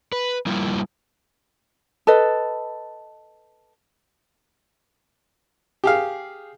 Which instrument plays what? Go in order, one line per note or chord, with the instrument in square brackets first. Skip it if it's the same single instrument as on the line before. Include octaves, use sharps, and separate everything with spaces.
[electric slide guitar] B4
G3 A#3 E4 F4
[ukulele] A4 B4 D#5
[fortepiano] G4 G#4 F5